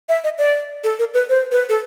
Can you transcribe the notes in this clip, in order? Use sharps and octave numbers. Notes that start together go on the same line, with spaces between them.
E5
D#5
D5
A4
A#4
B4
C5
B4
A4